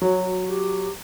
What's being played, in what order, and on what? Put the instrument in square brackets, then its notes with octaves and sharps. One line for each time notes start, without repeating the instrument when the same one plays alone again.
[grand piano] F#3 [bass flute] F#4
[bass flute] G4